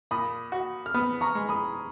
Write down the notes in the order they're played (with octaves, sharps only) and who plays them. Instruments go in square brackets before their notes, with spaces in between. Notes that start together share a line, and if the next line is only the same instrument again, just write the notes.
[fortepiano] A#2 [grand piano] B5 D#6
[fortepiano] F#4
[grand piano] F6
[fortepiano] B3 [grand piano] B5 D#6
[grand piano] A#5 C#6
[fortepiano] G#3
[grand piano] B5 D#6